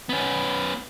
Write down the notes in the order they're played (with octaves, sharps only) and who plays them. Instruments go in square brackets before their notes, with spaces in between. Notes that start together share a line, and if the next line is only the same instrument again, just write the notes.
[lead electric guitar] B3 C#4